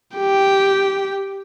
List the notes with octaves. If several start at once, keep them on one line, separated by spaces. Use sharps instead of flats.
G4 G5